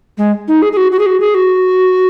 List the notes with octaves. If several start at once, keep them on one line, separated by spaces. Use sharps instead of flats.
G#3
D#4
G#4
G#4
F#4
F#4
G#4
F#4
G#4
F#4